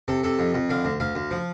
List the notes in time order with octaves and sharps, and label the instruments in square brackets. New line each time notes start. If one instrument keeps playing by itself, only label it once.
[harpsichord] C3 A4
C3 A4
F2
F2
D3 F5
D2
D2 F5
D2
F3